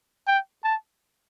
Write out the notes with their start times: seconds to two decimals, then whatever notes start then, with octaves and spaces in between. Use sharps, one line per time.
0.27 G5
0.64 A5